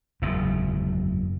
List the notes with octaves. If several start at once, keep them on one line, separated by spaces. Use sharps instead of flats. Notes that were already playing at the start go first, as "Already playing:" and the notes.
F#1 E2 G#2